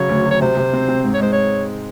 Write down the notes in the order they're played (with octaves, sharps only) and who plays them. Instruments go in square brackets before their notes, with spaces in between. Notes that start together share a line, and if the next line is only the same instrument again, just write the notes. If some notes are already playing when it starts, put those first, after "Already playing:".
Already playing: [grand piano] C#3 F#3 [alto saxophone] C#5
[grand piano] D2
F#3
[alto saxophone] C#5
[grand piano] C3 [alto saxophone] C5
[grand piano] C3
C4
C4
G#2
[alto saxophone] C#5
[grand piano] G#3 [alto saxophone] C5
[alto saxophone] C#5